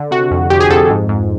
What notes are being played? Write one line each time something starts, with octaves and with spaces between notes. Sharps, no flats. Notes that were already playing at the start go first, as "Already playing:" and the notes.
Already playing: D3
C3 F#4
F2
F2 G4
G#4
F2 A4
G#2
G#2